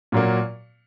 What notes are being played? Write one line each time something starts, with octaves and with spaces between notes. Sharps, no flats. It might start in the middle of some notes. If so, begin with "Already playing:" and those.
A#2 F#3 A#3